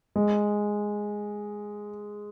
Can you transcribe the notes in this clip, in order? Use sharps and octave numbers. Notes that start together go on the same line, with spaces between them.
G#3